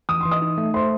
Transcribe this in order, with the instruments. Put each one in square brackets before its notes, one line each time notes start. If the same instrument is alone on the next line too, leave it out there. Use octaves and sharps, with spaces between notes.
[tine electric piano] E3 [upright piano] D#6
[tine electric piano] E3 [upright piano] C6
[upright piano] D#5 D#6
[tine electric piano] D#4
A3
[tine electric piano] A3 [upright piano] C5 C6